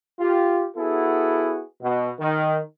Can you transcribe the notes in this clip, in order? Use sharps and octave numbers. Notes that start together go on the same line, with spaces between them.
F4 G4
B3 E4 F#4 G#4 A4
B2
D#3